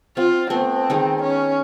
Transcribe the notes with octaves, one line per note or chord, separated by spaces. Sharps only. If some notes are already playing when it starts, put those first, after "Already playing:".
C4 F4
A3 B3 C4
D#3 G#3 D#4
C#4